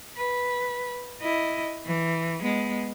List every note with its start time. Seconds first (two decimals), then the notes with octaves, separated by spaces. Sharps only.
0.17 B4
1.21 E4 D#5
1.86 E3
2.40 G#3 B3